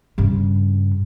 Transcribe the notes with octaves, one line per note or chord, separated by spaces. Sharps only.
G2 C#3